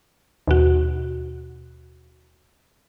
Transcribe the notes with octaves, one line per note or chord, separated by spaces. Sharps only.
D#2 B2 F#4